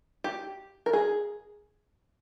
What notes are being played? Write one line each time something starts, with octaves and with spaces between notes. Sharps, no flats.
G4
A#4
G#4